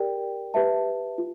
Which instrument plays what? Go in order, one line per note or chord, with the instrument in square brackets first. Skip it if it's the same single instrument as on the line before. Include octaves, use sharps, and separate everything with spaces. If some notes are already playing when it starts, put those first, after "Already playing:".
Already playing: [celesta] G4 A#4 D5 G5
G4 B4 E5 A5
F4